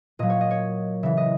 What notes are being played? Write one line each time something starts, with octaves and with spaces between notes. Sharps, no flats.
A#2 F#3 D#5
C#5
D#5
C#5
C#3 E3 E5
D#5